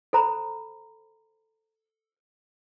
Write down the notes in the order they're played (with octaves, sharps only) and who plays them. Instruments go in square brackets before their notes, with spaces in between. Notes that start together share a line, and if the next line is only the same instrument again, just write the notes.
[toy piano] A4 C5 A#5 B5